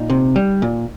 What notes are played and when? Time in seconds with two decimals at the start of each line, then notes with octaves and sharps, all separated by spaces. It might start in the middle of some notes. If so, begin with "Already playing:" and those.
Already playing: A#2 D#4
0.10 C3
0.36 G3
0.62 A#2